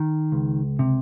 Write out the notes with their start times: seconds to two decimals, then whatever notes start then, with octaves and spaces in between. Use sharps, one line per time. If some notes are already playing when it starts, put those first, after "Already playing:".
Already playing: D#3
0.32 C#2
0.79 C3